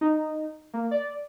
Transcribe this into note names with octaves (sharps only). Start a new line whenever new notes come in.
D#4
A#3
D5